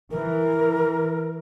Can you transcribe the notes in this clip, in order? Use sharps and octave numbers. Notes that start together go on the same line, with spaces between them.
E3 A#4